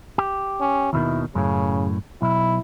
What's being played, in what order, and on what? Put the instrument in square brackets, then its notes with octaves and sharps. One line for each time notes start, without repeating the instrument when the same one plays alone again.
[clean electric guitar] G4
[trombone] C#4
[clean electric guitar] D#2 B2 D#3 [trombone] E4
[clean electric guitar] F#2 A2 [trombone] C#3
[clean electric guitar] B1 [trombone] E4